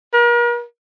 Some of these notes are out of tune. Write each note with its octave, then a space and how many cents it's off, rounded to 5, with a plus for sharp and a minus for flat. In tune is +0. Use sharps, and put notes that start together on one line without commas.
A#4 +40